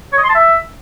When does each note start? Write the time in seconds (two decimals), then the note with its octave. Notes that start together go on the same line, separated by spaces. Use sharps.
0.12 C#5
0.18 D#5
0.24 C6
0.29 A5
0.35 E5